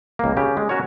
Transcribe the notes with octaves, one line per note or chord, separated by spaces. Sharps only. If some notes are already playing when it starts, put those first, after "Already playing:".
C#2 A#3
C#3 G4
G#3
C#4 F#4 A#4 C#5